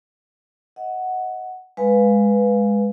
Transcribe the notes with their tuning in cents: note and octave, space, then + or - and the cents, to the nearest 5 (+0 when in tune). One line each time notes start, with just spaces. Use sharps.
D#5 +25 F#5 +0
G#3 +0 B4 +0 F5 +0